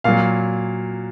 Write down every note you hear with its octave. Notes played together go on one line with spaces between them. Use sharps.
A#2 F#3 F5